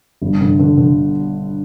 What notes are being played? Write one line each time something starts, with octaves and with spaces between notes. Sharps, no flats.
G1
D3
D3
D3